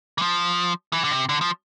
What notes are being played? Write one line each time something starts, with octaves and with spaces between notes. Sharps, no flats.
E3
F3
E3
D3
C3
D3
F3